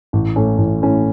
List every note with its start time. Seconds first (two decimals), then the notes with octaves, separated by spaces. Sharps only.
0.13 A1
0.36 A2 A3 C#4
0.58 A1
0.82 A2 A3 C#4